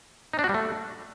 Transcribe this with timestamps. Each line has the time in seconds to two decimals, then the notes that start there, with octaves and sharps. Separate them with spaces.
0.33 D#4
0.39 D4
0.44 F#4
0.49 G3
0.54 A3